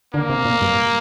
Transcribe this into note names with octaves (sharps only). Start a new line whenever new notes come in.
D3 A#3
C3
A#2
G2